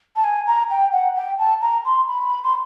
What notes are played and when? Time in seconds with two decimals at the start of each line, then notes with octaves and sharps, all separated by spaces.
0.16 A5
0.24 G#5
0.47 A#5
0.70 G5
0.92 F#5
1.16 G5
1.38 A5
1.62 A#5
1.85 C6
2.08 B5
2.44 C6